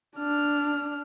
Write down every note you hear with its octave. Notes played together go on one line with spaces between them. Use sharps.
D4 F6